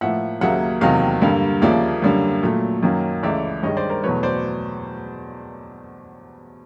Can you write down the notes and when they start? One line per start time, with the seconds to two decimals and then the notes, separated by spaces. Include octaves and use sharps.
0.01 A2 F3 A#3 E5 F#5
0.41 D#2 C#3 F#3 A#3 E5 F#5
0.81 E2 C3 D#3 F#3 A#3 D#5 F5
1.21 G2 D3 G3 A#3
1.62 D#2 C#3 F3 A#3 D5 E5
2.02 F#2 D3 G3 A#3
2.43 A#2 F#3 A3
2.83 F#2 D#3 F#3 A#3
3.23 C#2 C#3 E3 A3 D5 E5
3.63 G2 D#3 G#3 C#5 D#5
3.77 C5 D5
3.89 A#4 C5
4.03 E2 B2 F#3 A3 B4 C#5
4.23 C5 D5